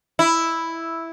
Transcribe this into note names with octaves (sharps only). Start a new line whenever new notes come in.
E4